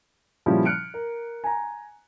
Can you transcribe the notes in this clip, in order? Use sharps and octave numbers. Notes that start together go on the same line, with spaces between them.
A#2 C#3 F3 G3 C#4 E4
F6 F#6 C#7 D7
A#4
G#5 A#5